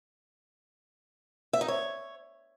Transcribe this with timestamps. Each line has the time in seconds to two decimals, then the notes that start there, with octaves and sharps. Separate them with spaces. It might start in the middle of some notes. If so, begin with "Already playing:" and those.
1.53 E5
1.61 D#4
1.68 C#5